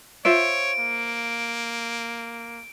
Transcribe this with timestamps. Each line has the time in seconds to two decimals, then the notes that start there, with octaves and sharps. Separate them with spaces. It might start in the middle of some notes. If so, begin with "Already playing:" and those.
0.25 F4 C5 C#5 E5 D7
0.79 A#3